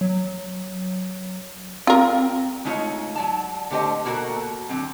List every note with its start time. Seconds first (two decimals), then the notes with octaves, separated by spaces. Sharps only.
0.01 F#3
1.87 C4 F4 A#4
2.65 G#3 A3 D#4 F4 C#5
3.15 F#3 D5 A5
3.71 D3 A3 G4 C5 D#5
4.05 B2 A#3 F#4 A4 A#4
4.69 D3 F#3 C4